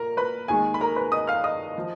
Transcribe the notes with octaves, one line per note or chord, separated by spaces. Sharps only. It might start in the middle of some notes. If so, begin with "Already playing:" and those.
Already playing: A#2 A#4 A#5
B4 B5
D#2 D#3 G#3 G#4 G#5
B5
A#4 A#5
B4 B5
D#5 D#6
F5 F6
D#5 D#6
F3